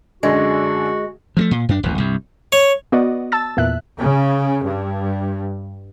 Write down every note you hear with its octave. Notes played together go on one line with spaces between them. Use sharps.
F#2 D3 G#3 D4 F#4
F3 G3 A3
A#2
F#2 D4
D1 A1 F2
C2 G2
C#5
B3 F#4 D5 D#5
A5 E6 A6
E2 A#2 E5 F#6
C#3
G2